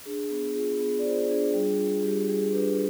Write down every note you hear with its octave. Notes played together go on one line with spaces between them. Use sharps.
D4 G#4
B3 G#4
F4 G#4
B3 G#4
D5
F4 G#4 C5
D4 G#4
G3 G#4
F4
G3 G4
G3 G#4
D4 G4 B4